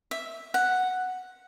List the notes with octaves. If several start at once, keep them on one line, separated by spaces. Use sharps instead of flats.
E5
F#5